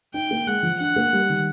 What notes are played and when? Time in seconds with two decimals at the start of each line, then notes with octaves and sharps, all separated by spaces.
0.14 D#4 G5
0.31 A#3
0.47 G#3 F#5
0.63 F3
0.80 D4 F#5
0.96 A#3
1.13 G3
1.29 D#3